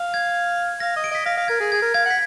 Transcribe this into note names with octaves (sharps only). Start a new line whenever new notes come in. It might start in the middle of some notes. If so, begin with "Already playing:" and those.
Already playing: F5
G#6
F5 A#6
D#5
D7
D#5 B6
F5 A#6
F5
A#4 G#6
G#4
G#4 G#6
A#4
F5 G#6
F#5 B6